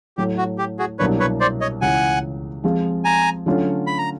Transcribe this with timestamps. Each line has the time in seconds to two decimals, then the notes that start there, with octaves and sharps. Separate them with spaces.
0.18 A2 F#3 A3 G4
0.38 F#4
0.58 G4
0.79 F#4 G#4
0.99 C2 B2 F#3 A#3 D4 B4 C#5
1.20 B4 C#5
1.41 C5 D5
1.61 C#5 D#5
1.81 C#2 C#3 E3 F#5 G#5
2.64 F3 G#3 C4 F4 G#4
3.05 G#5 A#5
3.46 D3 F#3 A3 C#4 F4
3.87 B5
3.98 A#5